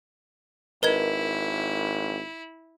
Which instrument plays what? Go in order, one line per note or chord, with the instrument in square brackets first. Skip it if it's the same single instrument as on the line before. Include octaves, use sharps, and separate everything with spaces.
[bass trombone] G#1 [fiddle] E4 [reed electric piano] A#4 [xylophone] B4 D#5 G#6